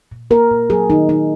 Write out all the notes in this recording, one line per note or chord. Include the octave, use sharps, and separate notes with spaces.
A#2
A#3 A#4
A#2
F#3 G#4
D#3 D#4
D#3 D#4